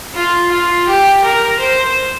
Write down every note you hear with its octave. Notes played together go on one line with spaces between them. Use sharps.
F4
F4
G4
A#4
C5